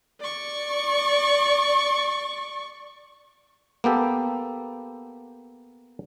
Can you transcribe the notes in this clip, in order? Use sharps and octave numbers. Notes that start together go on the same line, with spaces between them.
D5 C#6
A#3 B3 G4 A4